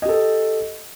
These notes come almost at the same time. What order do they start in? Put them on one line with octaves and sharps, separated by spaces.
D#5 G4 A4